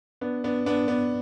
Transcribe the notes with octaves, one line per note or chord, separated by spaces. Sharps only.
B3 D4
B3 D4
B3 D4
B3 D4